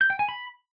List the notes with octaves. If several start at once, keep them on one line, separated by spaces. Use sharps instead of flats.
G6
G5
G#5
B5